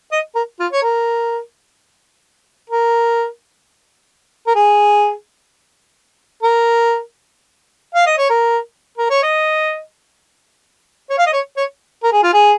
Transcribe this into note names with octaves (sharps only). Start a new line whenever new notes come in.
D#5
A#4
F4
C#5
A#4
A#4
A#4
G#4
A#4
F5
D#5
C#5
A#4
A#4
C#5
D#5
C#5
F5
D#5
C#5
C#5
A#4
G#4
F4
G#4